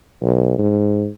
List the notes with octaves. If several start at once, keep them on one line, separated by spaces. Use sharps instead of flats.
B1
G#2